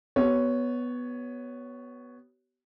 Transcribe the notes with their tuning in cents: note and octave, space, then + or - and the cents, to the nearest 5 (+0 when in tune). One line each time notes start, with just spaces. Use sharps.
B3 +0 G4 -45 C#5 +5